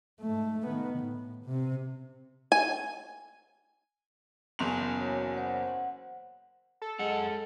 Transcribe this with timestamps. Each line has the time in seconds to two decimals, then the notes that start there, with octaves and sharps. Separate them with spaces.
0.21 G#2 A3
0.67 D#3 B3
0.99 A2
1.45 C3
2.52 G#5
4.59 F#1 E2 C6 F7
4.97 F#4 C#5
5.34 C5 F#5
5.67 F#5
6.82 A4
6.99 F#2 G#3 F#5